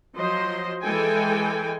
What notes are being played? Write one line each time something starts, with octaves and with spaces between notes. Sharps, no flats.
F3 F#3 C5 D#5 C6
E3 G#3 A4 G5 G#5